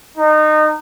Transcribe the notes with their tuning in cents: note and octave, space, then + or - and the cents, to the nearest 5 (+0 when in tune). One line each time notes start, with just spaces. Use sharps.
D#4 -25